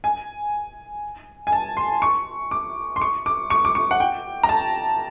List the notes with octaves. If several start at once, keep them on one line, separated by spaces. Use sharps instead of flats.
G#5
G#5
A5
C6
C#6
D6
C6
C#6
D6
C#6
D6
C#6
F#5
G5
A#5
A5